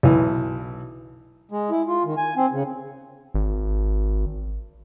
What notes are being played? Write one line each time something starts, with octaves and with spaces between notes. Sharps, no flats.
B1 E3
G#3
E4
F4
D#3
G#5
C4
C#3
G#1